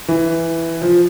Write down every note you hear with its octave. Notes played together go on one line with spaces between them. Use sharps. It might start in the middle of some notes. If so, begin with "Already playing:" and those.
E3
F3